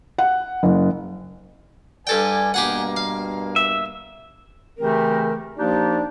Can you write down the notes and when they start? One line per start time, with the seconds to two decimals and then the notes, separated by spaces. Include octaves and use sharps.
0.18 F#5
0.63 F#1
2.07 G2 A4 B4 D5 G5 G#5
2.54 G2 B2 A#3 G4 G#4 F#5
2.96 F5
3.56 E5
4.79 C#3 E3 A3 C4 G4 A#4
5.57 F3 A#3 D4 D#4 G4 D5